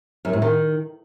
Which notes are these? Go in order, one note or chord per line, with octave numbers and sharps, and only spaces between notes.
F#2
A2
D#3